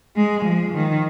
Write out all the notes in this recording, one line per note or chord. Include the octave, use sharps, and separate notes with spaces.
G#3
F3
D#3